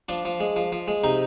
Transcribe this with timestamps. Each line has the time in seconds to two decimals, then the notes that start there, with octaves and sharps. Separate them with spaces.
0.09 F3 D4
0.25 F3
0.40 G#3
0.56 F3
0.72 F3
0.88 G#3
1.04 C3 D#4